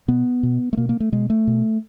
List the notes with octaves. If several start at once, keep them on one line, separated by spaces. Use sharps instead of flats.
B2 B3
B2
A3
B2 A#3
A#3
A3
B2 G#3
A3
B2